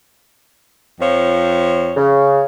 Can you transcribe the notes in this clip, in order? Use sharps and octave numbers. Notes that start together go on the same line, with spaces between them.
F2 F3 C#5
C#3